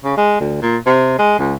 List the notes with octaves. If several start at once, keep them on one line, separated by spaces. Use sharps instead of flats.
C#3
G#3
D2
A#2
C3
G#3
C#2